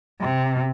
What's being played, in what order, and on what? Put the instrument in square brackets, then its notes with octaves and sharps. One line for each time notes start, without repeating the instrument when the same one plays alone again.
[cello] C3